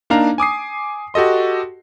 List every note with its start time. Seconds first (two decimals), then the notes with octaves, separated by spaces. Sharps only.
0.10 A#3 D4 D#4 F5 A#5
0.38 G#5 D6 D#6 C7
1.14 F#4 G4 A4 D#5 C6